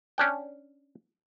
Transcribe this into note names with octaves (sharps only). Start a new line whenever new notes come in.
C#4 D4 G5